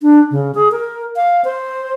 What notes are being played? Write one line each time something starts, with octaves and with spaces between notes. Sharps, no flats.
D4
C#3
G#4
A#4
F5
C5